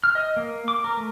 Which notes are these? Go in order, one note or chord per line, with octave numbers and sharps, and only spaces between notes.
F6
D#5
A#3
D6
A#4
A3